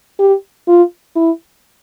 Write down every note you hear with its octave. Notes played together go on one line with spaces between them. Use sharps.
G4
F4
E4